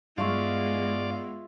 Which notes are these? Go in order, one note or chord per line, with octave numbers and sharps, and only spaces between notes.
G2 G#3 B3 F4 D5 E5 F5 C#6